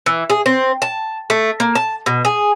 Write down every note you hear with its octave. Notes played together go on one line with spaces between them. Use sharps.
E3
G#4
C4
A5
A3
A#3
A5
B2
G#4